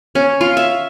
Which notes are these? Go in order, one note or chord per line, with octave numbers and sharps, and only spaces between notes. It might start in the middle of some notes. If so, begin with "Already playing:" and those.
C#4
F4
E5